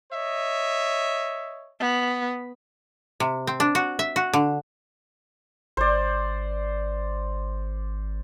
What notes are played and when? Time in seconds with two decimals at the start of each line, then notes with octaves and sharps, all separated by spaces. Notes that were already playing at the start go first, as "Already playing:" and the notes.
0.12 C#5 D#5 E5
1.80 B3
3.20 C3
3.47 C4
3.60 D4
3.75 F#4
3.99 E5
4.16 F#4
4.33 D3
5.77 G#1 C5 D5